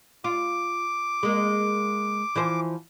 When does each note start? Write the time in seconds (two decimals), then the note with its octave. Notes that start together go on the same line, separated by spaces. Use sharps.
0.24 F4 D6
1.23 G#3 A#3
2.35 E3 F3 C5